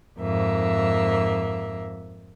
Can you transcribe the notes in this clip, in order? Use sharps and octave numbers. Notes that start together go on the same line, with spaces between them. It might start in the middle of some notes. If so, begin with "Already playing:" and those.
F2 G#2 A#3 E5